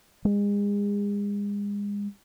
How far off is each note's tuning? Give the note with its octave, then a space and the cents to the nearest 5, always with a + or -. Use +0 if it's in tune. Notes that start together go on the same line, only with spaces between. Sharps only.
G#3 -35